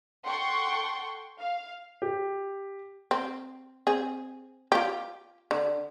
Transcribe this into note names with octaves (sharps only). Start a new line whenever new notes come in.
A4 F#5 G5 C6 C#6
F5
G4
C4
C4 G#4
F4 G4
D3